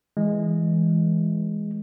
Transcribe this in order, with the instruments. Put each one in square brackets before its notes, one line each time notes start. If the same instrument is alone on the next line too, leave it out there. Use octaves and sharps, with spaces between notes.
[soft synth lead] E3 [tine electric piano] G#3